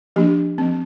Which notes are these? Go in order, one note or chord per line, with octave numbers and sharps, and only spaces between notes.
F3 A#3 D4 G4
F3 C4